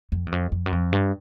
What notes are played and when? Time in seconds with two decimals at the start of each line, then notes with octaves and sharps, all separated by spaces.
0.12 F2
0.26 E2
0.32 F2
0.52 F2
0.66 F#2
0.72 F2
0.92 G2